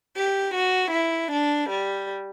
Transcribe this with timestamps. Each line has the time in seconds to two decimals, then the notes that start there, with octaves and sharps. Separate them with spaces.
0.16 G4
0.54 F#4
0.92 E4
1.31 D4
1.69 G3